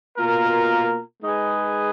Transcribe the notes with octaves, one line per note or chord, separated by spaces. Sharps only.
B2 A#3 F4 A#4
G#3 D#4 G#4 B4